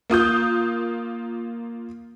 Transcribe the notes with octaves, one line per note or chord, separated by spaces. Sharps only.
A#3 F4 D#6 G6